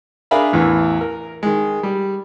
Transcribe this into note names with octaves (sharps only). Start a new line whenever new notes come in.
D4 G#4 A#4 E5 F5 B5
A1 E2 E3
A#4
D#3 G#3
G3